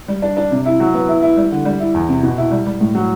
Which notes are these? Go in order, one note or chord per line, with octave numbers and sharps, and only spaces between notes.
G3
D4
D4
C3
E4
F#3
B3
E4
E4
G3
D3
G3
E4
E2
C3
B2
E4
G3
G3
A2
F#3